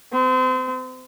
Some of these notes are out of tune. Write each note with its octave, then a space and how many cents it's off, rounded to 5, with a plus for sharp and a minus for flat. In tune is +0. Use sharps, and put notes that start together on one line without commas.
C4 -35